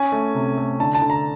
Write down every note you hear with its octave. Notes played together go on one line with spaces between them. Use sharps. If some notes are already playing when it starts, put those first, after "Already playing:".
Already playing: C#4 G#5
A3
C3
A3
D3 A5
A5
D3
A#5